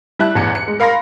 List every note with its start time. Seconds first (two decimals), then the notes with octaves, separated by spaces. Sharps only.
0.19 G3 E4 A5 F#6
0.35 A1 E2 C#7
0.55 C#7
0.68 G#3
0.80 A#4 F5 B5 C6 A#6